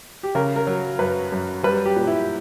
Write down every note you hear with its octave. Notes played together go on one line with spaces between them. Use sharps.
G4
C#3 A#4
A#4
F#3
F#2 B4
F#2
G3 B4
G4
A#2
E4